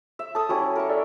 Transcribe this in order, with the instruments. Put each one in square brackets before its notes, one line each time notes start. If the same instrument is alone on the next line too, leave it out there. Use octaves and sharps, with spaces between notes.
[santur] E5
[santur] A4 D#6 [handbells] A5
[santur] G3 C#4 E4 [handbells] F#4
[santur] A#4 E5 C#6
[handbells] A4 D5